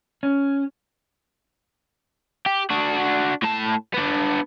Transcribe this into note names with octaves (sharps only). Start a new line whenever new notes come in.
C#4
G4
D4 F#4
A2 A5
B3 D4